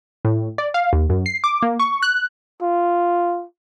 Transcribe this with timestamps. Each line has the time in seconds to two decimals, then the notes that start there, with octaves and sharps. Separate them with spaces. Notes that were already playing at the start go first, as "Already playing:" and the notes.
0.25 A2
0.58 D5
0.74 F5
0.93 D#2
1.09 F#2
1.26 C7
1.44 D6
1.62 A#3
1.79 C#6
2.02 F#6
2.62 F4